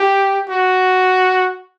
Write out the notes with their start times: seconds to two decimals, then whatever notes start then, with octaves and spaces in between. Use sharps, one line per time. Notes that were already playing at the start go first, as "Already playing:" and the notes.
Already playing: G4
0.49 F#4